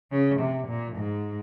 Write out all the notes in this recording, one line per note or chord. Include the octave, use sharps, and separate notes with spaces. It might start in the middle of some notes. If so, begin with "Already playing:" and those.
C#3
C3
A#2
G#2